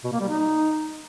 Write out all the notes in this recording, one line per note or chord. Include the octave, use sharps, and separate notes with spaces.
B2
A#3
G3
D#4